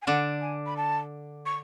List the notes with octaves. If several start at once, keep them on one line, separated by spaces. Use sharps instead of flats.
G#5
D3 D4 F#5
G#5
B5
A5
C#6